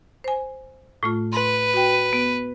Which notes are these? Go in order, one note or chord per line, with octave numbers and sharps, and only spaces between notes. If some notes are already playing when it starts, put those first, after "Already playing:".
C5 G#5
A2 A3 F4
B4 C6
F#4 G5
B3